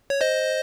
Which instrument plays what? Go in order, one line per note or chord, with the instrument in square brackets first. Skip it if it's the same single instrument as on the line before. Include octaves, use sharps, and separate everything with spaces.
[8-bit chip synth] C#5
C5 D#5